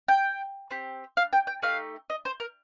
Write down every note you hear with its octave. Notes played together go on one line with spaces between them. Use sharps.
G5
C4 G4
F5
G5
G5
A3 D#4 G4 F5
D#5
C5
A#4